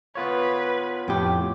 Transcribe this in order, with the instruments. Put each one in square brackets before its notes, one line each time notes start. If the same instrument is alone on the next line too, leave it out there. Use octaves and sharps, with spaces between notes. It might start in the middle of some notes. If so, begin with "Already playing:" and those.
[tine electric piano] B3 F4 C#5 [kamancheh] B4
[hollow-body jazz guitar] F2 A2 G4